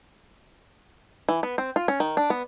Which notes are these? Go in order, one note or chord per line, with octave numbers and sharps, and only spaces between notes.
E3
B3
C4
F4
C#4
D#3
D4
B3